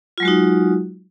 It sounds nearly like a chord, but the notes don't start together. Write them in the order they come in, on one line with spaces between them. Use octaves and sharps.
F4 F#3 G#3 F#4 D#4